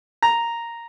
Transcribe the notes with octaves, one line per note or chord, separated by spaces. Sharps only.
A#5